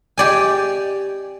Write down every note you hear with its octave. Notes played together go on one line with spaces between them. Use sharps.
G4 D5 G#5